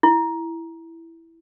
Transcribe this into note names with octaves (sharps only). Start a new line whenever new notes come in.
E4